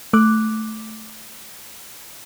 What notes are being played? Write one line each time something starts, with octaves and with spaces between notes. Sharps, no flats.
A3 D6 F#6